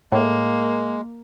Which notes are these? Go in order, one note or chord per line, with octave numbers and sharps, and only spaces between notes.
A2 G#3 A#3